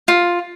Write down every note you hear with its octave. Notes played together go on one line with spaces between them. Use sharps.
F4